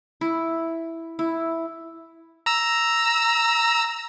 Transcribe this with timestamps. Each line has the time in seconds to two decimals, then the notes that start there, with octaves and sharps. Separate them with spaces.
0.21 E4
1.19 E4
2.46 A#5 E6